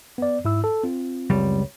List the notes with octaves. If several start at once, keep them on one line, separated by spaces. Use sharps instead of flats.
B3 D5
G#2 E4 E6
A4
C4 F4
C#2 F#2 G3